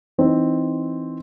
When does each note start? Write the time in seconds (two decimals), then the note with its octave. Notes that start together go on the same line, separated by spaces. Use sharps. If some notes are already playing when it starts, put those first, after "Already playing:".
0.18 E3 C4 D#4